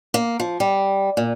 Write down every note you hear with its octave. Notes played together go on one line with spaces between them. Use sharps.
A#3
F3
G3
A#2